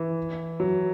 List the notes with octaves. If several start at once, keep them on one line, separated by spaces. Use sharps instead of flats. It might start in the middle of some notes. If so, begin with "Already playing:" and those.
Already playing: E3
F#3